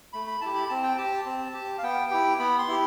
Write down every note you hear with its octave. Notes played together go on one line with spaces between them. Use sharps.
A3 B5
B5
E4 G4 A5
B5
C4 A5
G5
G4 A5
C4
G4
F5
B3 G5
E4 G4
B3 B5
C6
E4 G4